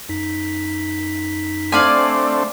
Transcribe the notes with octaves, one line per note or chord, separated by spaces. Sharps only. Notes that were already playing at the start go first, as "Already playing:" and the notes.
F#2 D#4 B6
A3 C4 D4 D5 F5 G#5